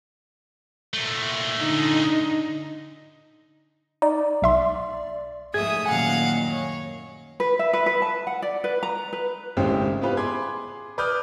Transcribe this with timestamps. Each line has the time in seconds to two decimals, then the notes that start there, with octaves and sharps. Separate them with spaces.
0.94 A#2 A3
1.61 D3 D#4
4.02 D#4 D5
4.42 B1 E5 C6
5.54 G#2 F3 A3 G#4 E5 D#6 G#6
5.86 F#2 A#2 D#3 F5 F#5 G#5
6.50 C#5
7.40 B4
7.59 E5
7.73 B4
7.86 B4
8.02 A5
8.27 F#5
8.42 D5
8.64 B4
8.83 A#5
9.13 B4
9.57 G#1 A2 C#3 G#3 G4 C5
10.01 B3 C4 F4 G4 B4
10.17 G#4 B5 C6 D6 G#6
10.98 B4 D5 D6 D#6 F6 G6